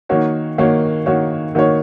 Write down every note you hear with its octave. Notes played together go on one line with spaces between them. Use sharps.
D#3 A#3 F#4 C#5
D#3 A#3 F#4 C#5
D#3 A#3 F#4 C#5
D#3 A#3 F#4 C#5